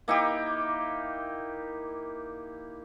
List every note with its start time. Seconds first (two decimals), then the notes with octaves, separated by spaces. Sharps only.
0.08 A#3 D#4 E4 G4